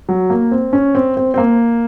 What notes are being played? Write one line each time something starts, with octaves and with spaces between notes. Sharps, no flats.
F#3
A#3
C4
C#4
C4
C4
C4
A#3